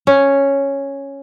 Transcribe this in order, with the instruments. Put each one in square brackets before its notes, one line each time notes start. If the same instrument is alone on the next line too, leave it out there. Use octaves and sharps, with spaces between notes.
[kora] C#4